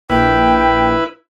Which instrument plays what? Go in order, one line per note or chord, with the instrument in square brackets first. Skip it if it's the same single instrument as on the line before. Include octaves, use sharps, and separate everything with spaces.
[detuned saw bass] A#1 [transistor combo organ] E4 B4 [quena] G5